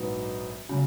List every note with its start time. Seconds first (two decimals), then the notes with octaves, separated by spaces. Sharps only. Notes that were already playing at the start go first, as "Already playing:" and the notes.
Already playing: A#1 G#2 F#3 B3 D#4
0.69 C#3 F#3